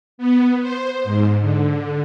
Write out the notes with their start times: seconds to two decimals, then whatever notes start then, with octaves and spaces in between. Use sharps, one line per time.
0.18 B3
0.61 C5
1.04 G#2
1.41 D3